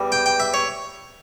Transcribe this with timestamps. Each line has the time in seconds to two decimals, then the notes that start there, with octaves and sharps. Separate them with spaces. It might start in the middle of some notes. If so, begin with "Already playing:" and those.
Already playing: E2 G3
0.12 G5
0.26 G5
0.40 E5
0.54 C#5